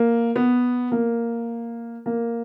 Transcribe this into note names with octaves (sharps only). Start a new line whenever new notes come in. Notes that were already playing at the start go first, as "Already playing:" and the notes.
Already playing: A#3
B3
A#3
A#3